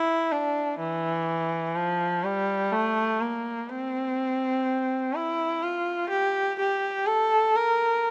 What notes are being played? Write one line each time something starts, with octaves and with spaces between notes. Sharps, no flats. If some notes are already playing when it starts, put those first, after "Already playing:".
Already playing: E4
D4
E3
F3
G3
A3
A#3
C4
E4
F4
G4
G4
A4
A#4